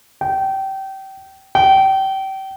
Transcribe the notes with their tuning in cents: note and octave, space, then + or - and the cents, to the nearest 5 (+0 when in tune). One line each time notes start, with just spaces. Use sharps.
G5 -25
G5 -30